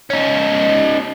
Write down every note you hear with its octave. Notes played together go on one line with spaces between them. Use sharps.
C#4 D#4